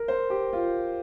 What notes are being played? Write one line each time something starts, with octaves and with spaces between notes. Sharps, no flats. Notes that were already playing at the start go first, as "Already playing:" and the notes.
Already playing: A#4
C5
G4
F4